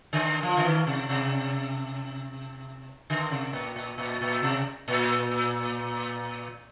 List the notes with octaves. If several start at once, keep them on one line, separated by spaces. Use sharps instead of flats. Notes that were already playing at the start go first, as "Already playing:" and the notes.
D3
F3
D3
D#3
C3
C3
D3
C3
A#2
A#2
A#2
A#2
C3
A#2